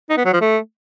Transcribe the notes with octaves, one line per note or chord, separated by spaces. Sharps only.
D#4
B3
F#3
F3
A3